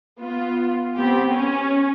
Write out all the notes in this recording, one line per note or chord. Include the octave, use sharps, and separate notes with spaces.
B3 F4
B3 C4 G4
C#4